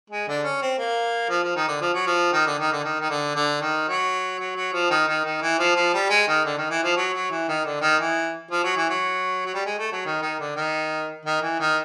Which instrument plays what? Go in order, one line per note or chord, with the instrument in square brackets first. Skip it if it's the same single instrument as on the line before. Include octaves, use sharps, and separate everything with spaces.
[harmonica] G#3
D3 D4
C#4
C4
A#3
F3
F3
D#3
D3
F3
F#3
F3
D#3
D3
D#3
D3
D#3
D#3
D3
D3
D#3
F#3
F#3
F#3
F3
D#3
D#3
D#3
E3
F3
F3
G3
G#3
D#3
D3
D#3
E3
F3
F#3
F#3
E3
D#3
D3
D#3
E3
F3
F#3
E3
F#3
F#3
G3
G#3
A3
F#3
D#3
D#3
D3
D#3
D#3
E3
D#3